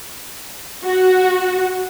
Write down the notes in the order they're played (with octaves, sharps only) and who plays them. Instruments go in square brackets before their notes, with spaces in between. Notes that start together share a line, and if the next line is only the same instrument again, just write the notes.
[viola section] F#4